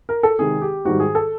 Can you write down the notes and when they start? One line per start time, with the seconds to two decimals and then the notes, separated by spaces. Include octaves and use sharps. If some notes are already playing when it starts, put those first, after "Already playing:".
0.09 A#4
0.23 A4
0.39 C3 D#3 G#3 G#4
0.62 G4
0.85 G#2 D#3 G3 F#4
1.00 G#4
1.15 A4